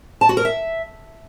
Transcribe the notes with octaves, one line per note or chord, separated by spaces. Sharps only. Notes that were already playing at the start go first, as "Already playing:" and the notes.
A5
F#4
A#4
E5